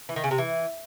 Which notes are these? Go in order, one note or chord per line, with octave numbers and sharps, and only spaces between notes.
E3
D#3
C#3
C3
E3